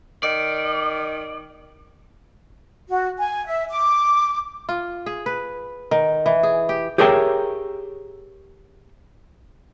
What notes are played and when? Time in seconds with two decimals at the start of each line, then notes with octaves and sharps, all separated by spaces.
0.23 D#3 D5
2.89 F#4
3.20 G#5
3.47 E5
3.70 D6
4.69 F4
5.06 G#4
5.26 B4
5.91 D#3
6.26 E3
6.43 G#4
6.69 G4
6.98 G4 G#4 A#4 C#5 E5 G5